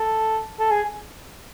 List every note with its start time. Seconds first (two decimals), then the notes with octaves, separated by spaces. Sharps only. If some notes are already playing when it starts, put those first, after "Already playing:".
Already playing: A4
0.59 A4
0.71 G#4